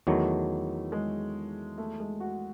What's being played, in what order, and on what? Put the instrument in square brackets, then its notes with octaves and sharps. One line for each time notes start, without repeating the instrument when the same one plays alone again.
[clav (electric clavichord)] E2 D#3 F#3 [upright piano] A3
[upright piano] G#3
A3
G#3
F#4